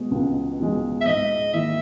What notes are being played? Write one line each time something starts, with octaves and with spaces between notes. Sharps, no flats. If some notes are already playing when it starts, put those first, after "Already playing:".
Already playing: B2 G#3
C#2
B2 G#3
E5
G#2 D#5
D#3 A#3 E4 E5